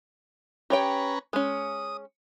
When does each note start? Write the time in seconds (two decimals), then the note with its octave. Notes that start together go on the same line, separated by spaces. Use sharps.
0.70 C#4 G4 B4 C#5 G5 A#5
1.33 G#3 C#4 D#6